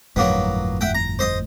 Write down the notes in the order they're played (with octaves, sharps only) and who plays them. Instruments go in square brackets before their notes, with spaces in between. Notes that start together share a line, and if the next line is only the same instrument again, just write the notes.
[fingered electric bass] G1 F2 A2 [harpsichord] F#3 A#3 B3
[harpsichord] E5 F#5 G5
A#5
C5 D#5 D#6